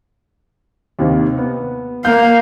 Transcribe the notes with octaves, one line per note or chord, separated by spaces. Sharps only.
D#2 C3 D#3
B3
A#3 F5 G6